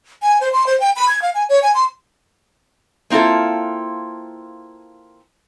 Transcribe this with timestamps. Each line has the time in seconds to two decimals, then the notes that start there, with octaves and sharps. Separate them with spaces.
0.22 G#5
0.41 C5
0.53 C6
0.67 C5
0.80 G5
0.96 B5
1.09 G#6
1.22 F5
1.35 G#5
1.49 C#5
1.63 G#5
1.74 C6
3.10 A#3 C4 E4 F4 A4